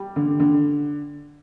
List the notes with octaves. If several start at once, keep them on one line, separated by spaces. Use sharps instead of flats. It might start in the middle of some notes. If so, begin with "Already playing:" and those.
Already playing: G3
D3
D3